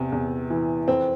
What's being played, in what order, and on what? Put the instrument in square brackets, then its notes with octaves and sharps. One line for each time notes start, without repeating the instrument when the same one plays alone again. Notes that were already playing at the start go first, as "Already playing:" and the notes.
Already playing: [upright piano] E2 C3
E2
E3
F2 C4